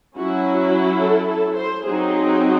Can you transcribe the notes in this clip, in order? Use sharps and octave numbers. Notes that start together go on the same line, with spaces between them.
F#3 C#4 E4 F#4
A4
A4
C5
F#3 C4 D#4 G#4